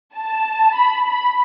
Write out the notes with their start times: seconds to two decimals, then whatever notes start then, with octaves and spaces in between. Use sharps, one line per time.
0.16 A5
0.76 B5
1.07 B5